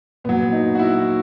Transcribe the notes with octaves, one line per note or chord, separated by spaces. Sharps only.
A#2 F#3 B3
D#4
F#4
E4